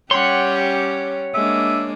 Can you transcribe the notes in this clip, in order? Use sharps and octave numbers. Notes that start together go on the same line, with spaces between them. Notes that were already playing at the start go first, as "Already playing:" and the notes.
G3 C#4 G4 C#5 F#5 G5 C6
G#3 A#3 D4 E5